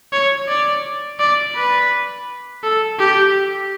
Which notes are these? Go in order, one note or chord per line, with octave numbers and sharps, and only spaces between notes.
C#5
D5
D5
B4
A4
G4